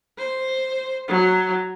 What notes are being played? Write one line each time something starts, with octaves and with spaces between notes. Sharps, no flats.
C5
F#3